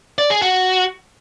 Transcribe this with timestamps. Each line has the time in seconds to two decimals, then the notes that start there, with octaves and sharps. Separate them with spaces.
0.18 D5
0.30 G#4
0.42 F#4